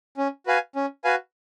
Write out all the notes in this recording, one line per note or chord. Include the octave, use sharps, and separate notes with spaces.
C#4
F#4 B4 F5 G#5
C#4
F#4 B4 F5 G#5